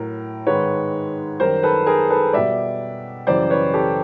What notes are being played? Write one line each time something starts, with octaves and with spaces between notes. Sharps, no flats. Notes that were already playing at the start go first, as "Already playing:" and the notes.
Already playing: A2 F#3 A#4
G#2 D#3 G#3 B4 C#5
F#2 D#3 G3 A#4 C5
A4 B4
G#4 A#4
A4 B4
B2 G3 D5 E5
F#2 C#3 E3 G3 C5 D5
B4 C#5
G4 A4